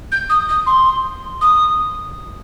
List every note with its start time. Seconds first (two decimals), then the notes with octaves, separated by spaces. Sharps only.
0.12 G6
0.29 D#6
0.49 D#6
0.66 C6
1.41 D#6